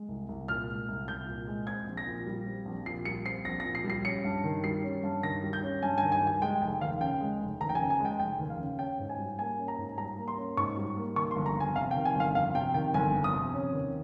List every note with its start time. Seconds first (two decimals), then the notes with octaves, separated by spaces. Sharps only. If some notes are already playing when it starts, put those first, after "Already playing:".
Already playing: G#3
0.08 C2
0.29 C2
0.48 A#2 F6
0.68 G#3
0.88 C2
1.08 C2 G6
1.28 A#2
1.47 G#3
1.67 C4 G#6
1.87 A#1
1.97 A#6
2.07 A#2
2.26 G3
2.47 C4
2.66 A#1
2.86 A#2 C7
3.05 G3 C#7
3.25 C4 C7
3.45 A#1 A#6
3.60 A#6
3.65 A#2
3.75 C7
3.84 G3
3.90 C7
4.05 C#4 C#7
4.24 G2
4.44 D#3
4.64 G3 C7
4.83 C#4
5.03 G2
5.23 D#3 A#6
5.43 G3
5.53 G6
5.63 C#4
5.83 G2 G#5
5.98 G#5
6.03 D#3
6.12 G#5
6.22 G3
6.27 G#5
6.42 G#3 G5
6.62 F1 G5
6.81 D#2 F5
7.01 C#3 G5
7.21 G#3
7.41 F1
7.61 D#2 A#5
7.69 G5
7.75 G#5
7.80 C#3
7.90 G#5
8.00 G#3 G5
8.19 F1 G5
8.39 D#2
8.50 F5
8.59 C#3
8.79 C#4 G5
8.99 G#2
9.09 G#5
9.18 G3
9.39 A#3 G#5
9.58 C#4
9.68 A#5
9.78 G#2
9.98 G3 A#5
10.18 A#3
10.28 C6
10.37 C#4
10.57 G#2 C#6
10.77 G3
10.97 A#3
11.16 D#3 C#6
11.31 C6
11.36 G1
11.46 A#5
11.56 F2 G#5
11.76 C3 F5
11.91 G5
11.95 D#3
12.05 G#5
12.15 G1 F5
12.35 F2 F5
12.55 C3 G5
12.74 D#3 G5
12.94 G1 G#5
13.14 F2
13.24 D#6
13.34 C3
13.54 C#4
13.73 D#2